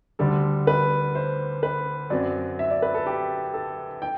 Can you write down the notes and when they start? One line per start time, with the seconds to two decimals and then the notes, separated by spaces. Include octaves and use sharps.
0.19 D2 D3 G3 A4
0.67 B4
1.15 C5
1.63 B4
2.10 F#2 F#3 C4 D5
2.59 E5
2.70 D5
2.82 B4
2.94 A4
3.06 G4
3.54 A4
4.02 G5